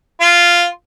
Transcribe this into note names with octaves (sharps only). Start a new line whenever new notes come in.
F4